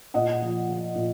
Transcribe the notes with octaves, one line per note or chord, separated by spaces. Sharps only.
A#2 D#5 F#5
F3
F3
A#2